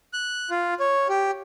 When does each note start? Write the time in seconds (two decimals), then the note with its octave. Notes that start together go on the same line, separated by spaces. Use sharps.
0.13 F#6
0.50 F4
0.80 C#5
1.09 G4